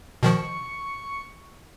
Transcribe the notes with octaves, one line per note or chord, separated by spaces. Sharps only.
B2 D#3 F3 C#6